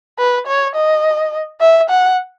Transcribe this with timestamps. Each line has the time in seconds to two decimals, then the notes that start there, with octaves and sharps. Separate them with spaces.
0.19 B4
0.47 C#5
0.75 D#5
1.61 E5
1.90 F#5